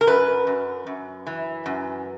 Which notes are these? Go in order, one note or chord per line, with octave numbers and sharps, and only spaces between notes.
A#4
F#2 B4
F#2
F#2
E3
F#2